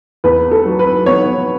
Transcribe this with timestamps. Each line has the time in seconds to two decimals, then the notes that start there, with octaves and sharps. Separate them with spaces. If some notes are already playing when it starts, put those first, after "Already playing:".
0.24 E2 B4
0.51 A4
0.65 F#3
0.79 B4
1.06 B3 C#5